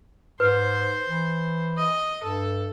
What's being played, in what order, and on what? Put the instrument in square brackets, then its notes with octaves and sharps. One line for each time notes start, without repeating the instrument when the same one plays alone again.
[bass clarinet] G#2 [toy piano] B4 [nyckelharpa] C5
[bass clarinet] E3
[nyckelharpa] D#5
[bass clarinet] G2 [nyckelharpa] A4